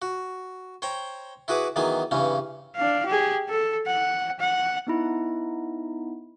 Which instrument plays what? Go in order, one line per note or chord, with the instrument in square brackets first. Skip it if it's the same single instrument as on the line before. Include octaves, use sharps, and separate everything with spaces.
[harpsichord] F#4
C5 C#5 G5 A#5
E4 F#4 G#4 B4 F#5 D6
D#3 E3 F#3 B3 G#4
G2 C#3 E3 C4 C#4
[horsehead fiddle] D4 F5
G4 G#4
A4
F#5
F#5
[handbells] B3 D#4 E4